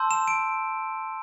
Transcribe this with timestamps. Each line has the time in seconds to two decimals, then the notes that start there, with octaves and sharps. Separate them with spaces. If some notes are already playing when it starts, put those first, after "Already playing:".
Already playing: A5 C6 E6 G6
0.11 E7
0.28 D7